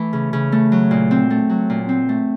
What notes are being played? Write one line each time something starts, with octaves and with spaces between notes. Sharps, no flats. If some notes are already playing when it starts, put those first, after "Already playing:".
Already playing: E3 A3
C#3
C#3
A3
F#3
A#2
C4
A3
F#3
A#2
C4
A3